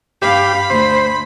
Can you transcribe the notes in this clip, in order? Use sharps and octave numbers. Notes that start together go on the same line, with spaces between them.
G2 G4 F5 B5
D2 C5